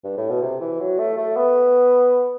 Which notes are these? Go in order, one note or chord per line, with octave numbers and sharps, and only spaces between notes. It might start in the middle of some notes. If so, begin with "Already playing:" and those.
G2
A2
B2
C3
E3
F#3
A3
A3
B3